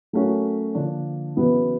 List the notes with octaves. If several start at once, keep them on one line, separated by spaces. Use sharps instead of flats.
F#3 A3 C#4 F#4 A#4
D3 F3 A#3 D4
E2 C#3 F#3 B3 E4